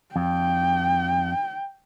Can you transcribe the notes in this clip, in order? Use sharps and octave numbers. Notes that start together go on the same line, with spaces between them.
F2 G5